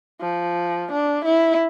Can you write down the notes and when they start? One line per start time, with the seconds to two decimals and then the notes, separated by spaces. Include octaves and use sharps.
0.21 F3
0.92 D4
1.25 E4